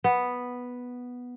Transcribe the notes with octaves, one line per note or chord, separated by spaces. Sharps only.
B3